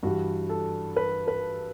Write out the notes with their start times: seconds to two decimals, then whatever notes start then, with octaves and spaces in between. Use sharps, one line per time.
0.03 G2 E3 G3 F#4
0.50 A4
0.96 B4
1.28 B4